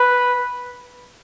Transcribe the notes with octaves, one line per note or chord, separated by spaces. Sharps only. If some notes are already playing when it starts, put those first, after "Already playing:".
Already playing: B4